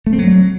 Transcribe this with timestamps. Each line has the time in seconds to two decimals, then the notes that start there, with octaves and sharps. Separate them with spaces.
0.07 A3
0.13 C4
0.19 F#3